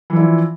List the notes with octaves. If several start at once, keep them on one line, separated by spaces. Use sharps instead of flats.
E3 F3 D4 E4